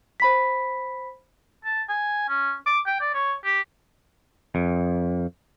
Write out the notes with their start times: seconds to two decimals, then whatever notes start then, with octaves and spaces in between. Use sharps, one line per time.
0.20 C5 B5 B6
1.65 A5
1.89 G#5
2.29 C#4
2.66 D6
2.87 G5
3.01 D5
3.14 C#5
3.45 G4
4.55 F2